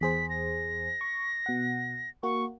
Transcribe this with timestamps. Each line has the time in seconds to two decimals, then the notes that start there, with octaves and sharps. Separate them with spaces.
0.01 E2 G#4 C5 B6
0.30 A#6
1.01 C#6
1.46 B2 F#5
2.23 A#3 F#4 C#6